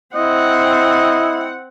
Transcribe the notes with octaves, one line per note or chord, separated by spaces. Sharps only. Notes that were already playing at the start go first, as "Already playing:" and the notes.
C4 E4 D#5 F#5